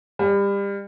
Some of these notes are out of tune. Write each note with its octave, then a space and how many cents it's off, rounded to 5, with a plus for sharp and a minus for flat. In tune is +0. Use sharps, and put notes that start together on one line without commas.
G3 +30